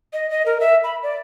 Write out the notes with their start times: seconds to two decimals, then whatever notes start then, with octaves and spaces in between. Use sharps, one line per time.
0.13 D#5
0.30 D#5
0.46 A#4
0.60 E5
0.84 B5
1.03 D5